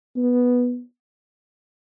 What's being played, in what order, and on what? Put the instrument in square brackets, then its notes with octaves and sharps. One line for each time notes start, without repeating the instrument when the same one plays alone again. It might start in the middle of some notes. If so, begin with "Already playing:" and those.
[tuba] B3